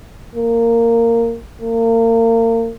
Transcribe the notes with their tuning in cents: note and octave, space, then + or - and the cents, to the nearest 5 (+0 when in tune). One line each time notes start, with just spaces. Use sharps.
A#3 -15
A#3 -35